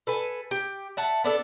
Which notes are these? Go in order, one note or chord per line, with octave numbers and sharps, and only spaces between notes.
A4 B4 G#5
G4
E5 F#5 A5
B3 D4 A4